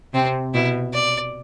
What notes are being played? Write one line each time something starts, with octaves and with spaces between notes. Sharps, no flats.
C3 C4
B2 E4
D5